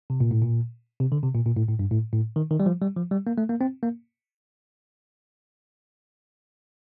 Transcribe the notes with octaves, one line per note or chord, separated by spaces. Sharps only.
C3
A#2
A2
A#2
C3
D3
C3
A#2
A#2
A2
A2
G2
A2
A2
D#3
D#3
G3
F3
G3
F3
G3
A#3
A3
A#3
C4
A#3